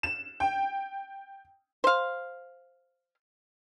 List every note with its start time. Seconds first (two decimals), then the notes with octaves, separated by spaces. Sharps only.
0.03 E7
0.40 G5
1.84 C5 F5